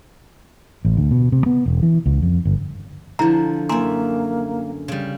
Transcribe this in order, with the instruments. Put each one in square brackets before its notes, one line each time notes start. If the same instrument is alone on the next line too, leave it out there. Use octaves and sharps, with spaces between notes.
[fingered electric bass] A1
D2
B2
C3
B3
E1
E3
C#2
F2
G1
[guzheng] D3 F3 [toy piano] E4 A#5
[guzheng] F#2 E5 [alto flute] A#3 [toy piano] G#5 A#5 C6
[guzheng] C#3 G3